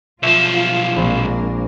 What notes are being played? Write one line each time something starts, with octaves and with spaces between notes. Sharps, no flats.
B1 F3 F4 E5
F5
A#1 G#3 A#3 C4 D4